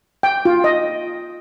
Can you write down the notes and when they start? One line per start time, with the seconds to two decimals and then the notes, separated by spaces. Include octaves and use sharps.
0.23 G5
0.45 F4
0.64 D#5